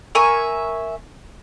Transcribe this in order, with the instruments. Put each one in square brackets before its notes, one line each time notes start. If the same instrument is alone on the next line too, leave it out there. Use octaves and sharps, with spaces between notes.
[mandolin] A#4 E5 G#5 C#6